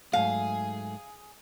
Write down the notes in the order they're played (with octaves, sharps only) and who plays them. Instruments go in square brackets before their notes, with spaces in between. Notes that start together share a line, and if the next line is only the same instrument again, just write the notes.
[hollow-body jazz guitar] G#2 F#3 A3 [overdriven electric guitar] G#4 [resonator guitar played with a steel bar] F5